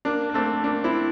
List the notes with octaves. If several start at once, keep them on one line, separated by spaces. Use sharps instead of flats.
A#3 D4
A#3
A3 C4
A#3 D4
C4 E4